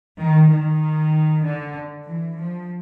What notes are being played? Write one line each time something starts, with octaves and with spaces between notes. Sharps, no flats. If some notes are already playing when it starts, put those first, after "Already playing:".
D#3
D#3
D3
E3
F3